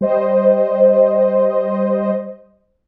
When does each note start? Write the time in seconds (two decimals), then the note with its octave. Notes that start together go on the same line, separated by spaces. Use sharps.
0.01 G3 C5 D#5